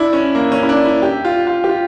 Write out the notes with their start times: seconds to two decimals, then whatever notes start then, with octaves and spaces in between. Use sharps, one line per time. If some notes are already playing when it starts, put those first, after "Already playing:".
Already playing: D4 E4
0.13 C#4
0.35 A#3
0.52 C#4
0.63 E4
0.69 D4
0.85 E4
1.02 G4
1.25 F4
1.47 F4
1.64 G4
1.69 F4